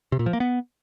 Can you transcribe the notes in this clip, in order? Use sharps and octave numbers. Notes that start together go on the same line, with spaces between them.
C3
A#2
F3
A#3
B3